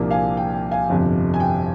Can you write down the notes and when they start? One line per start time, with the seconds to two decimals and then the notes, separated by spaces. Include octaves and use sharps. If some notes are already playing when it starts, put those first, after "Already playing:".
Already playing: C2 A#2 F3 A#3 D4
0.10 F5 G#5
0.37 G5
0.54 G5
0.71 F5 G#5
0.89 G1 F2 C3 F3
1.34 G#5
1.40 G5